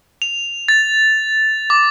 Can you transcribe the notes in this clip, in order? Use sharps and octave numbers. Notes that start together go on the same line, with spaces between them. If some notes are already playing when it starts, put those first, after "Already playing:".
F7
A6
D6